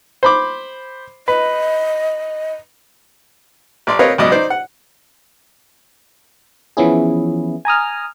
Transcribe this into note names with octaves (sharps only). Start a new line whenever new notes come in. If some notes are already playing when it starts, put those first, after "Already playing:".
C5 B5 D6
B4 D#5
A#1 D5 C6
C4 A#4 B4 C#5 D#5 F5
C#2 B2 F#3 D5 D#5
D#4 C5 D5
F#5
E3 F3 B3 C#4 E4 G#4
G#5 A#5 D#6 F6